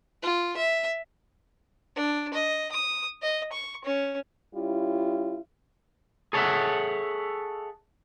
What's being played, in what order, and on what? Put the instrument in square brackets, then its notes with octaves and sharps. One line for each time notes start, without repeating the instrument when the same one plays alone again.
[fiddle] F4
E5
D4
D#5
D#6
D#5
C#6
C#4
[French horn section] G3 C#4 E4 F4
[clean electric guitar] G#4 A4 C#5 D5 E5 F#5